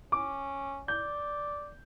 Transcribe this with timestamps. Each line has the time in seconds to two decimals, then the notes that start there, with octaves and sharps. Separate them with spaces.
0.12 C#4 D6
0.88 D5 G6